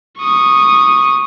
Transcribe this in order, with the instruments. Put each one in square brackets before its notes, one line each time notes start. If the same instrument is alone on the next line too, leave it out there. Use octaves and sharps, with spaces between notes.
[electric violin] C#6 D#6